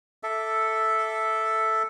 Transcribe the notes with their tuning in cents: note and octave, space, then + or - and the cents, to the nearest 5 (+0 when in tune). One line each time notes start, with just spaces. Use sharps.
A4 +0 E5 +0 D6 +5